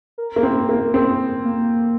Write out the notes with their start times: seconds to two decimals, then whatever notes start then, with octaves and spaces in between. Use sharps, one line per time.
0.18 A#4
0.36 A#3
0.43 C4
0.69 A#3
0.85 A#4
0.94 C4 G#4
1.45 A#3